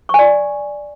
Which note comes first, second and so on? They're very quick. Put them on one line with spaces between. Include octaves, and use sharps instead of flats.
C#6 G#5 D5